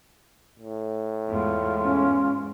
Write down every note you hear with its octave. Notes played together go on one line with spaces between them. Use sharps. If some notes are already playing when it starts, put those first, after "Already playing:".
A2
E2 G#2 F4
C#4